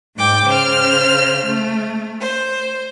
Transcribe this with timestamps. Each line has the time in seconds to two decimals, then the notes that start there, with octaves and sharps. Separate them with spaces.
0.17 G#2 G5 D6
0.45 C#3 C5 F6
1.48 A3
2.18 C5